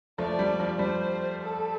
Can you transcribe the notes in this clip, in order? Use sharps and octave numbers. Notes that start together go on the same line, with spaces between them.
F3 A3 D5
G3
F3
G3 C5
A4